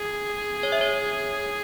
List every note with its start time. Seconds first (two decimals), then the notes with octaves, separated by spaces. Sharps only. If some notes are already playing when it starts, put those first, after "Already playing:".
Already playing: G#4
0.63 C#5
0.72 E5
0.81 C#5